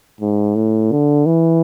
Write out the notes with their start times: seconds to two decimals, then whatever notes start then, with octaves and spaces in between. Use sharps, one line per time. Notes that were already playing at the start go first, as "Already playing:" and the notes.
0.21 G#2
0.55 A2
0.91 D3
1.26 E3